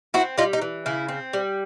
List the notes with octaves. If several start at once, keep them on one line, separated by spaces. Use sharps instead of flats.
C4 E4 F#4
G3 D#4 F4
D#4
E3
C#3 E4
C4
G3